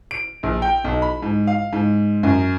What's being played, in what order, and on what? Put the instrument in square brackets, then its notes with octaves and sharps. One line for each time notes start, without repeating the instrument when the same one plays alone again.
[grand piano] D7
A#1
G5
B1
B5
G#2
F5
G#2
F#2